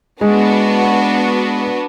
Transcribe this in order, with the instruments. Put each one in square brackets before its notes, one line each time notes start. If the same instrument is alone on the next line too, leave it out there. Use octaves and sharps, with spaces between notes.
[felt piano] G#3 [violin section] B3 D4 F#4